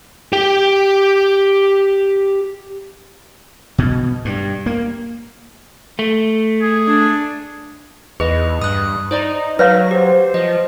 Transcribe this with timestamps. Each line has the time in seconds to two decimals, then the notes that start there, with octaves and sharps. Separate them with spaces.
0.33 G4 G5
3.78 B2
4.25 G2
4.66 A#3
5.99 A3
6.61 G#4
6.88 D4
8.20 E2 G#4 B4 D#5
8.62 G2 D#6 F#6
9.11 D#4 C5 D5 A#5
9.59 F#3 B4 C#5 F5 A#6
9.91 G4 C5
10.34 F3 D#5